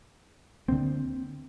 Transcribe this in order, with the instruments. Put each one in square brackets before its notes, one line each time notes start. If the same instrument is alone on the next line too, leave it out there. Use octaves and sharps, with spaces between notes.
[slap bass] D2 D3 A#3 C4